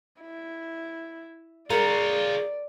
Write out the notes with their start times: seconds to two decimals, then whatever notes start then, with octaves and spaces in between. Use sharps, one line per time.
0.21 E4
1.70 F4 G#4 A#4 C#5 D5